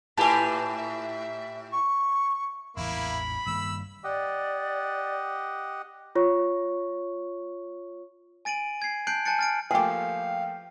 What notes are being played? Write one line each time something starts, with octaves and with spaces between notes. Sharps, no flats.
A2 E4 G4 B4 G#5 A5
E5
C#6
A1 E2 G#2 A#3 E4 B5
G2 D#3 A#3 E6
G4 D5 D#5 F#5
F4 C#5 C#6
G#5 A6 D7 D#7 F#7
G#6 C7
A5 F#6 G6 C7 D7 F#7
G#5 A5 F#6 G6 A6 C#7
F6 A6 D7
F3 A3 A#3 G4 G#4 F5 G5